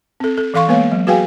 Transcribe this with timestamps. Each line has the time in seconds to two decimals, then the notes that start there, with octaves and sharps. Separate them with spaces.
0.20 C4 A4
0.38 A4
0.54 E3 A4 F5 C6 C#6
0.68 G#3 A#3 B3 B4 C#5 F5
0.92 F#3
1.07 F#4 G#4 B4 F5 G5 G#5